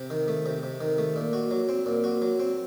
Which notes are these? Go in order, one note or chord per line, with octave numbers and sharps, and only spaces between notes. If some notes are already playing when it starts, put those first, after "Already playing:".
Already playing: C3
D#3
A3
C3
C3
D#3
A3
A#2
F#4
F#3
C4
A#2
F#4
F#3
C4